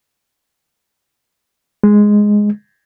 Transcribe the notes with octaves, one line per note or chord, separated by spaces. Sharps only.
G#3